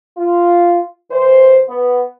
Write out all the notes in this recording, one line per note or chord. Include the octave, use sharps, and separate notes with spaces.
F4
E3 C5
B3